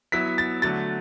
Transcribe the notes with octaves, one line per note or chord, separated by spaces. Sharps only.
F#3 B3 E4 B6
A6
D3 F#3 A3 A6